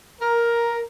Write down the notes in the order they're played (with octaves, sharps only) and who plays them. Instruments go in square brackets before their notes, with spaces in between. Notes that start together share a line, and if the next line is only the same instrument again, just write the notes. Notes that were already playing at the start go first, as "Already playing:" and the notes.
[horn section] A#4